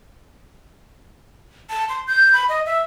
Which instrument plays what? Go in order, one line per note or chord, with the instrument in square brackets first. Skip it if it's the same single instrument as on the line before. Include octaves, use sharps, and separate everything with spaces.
[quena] A5
C6
G6
B5
D#5
E5